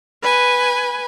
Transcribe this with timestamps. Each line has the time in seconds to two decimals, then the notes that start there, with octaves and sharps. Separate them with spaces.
0.22 B4 G#5